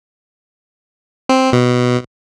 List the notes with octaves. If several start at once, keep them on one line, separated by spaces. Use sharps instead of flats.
C4
B2